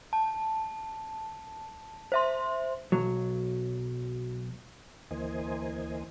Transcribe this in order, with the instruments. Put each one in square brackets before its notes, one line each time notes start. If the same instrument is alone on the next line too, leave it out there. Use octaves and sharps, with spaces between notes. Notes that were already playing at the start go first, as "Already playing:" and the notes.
[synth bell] A5
C5 E5 C6
[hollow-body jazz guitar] B1 F#3
[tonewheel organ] D2 E3 A#3 C5 D#5 G#5